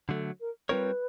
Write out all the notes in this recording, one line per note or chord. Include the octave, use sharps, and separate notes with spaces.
D3 F#3 A3 A4
A#4
G3 C4 F4 A#4 B4 C#5